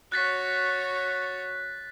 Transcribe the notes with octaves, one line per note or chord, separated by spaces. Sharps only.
F#4 C#5 F#6 A6 B6